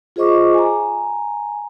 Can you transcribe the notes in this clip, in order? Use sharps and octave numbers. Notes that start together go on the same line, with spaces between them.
F4 G#4 C5 D#5 C#6 D6
G#5 A#5